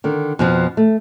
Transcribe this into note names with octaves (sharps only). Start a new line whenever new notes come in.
D3 D#3
F2 B2 F3
A3